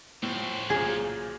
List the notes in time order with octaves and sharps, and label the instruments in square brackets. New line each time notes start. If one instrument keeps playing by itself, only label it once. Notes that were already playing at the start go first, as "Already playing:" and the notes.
[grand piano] A2 F3 [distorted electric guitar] C#3 C5
[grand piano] B1 A#2 [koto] G#4